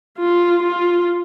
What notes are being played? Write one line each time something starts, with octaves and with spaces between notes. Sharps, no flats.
F4
F4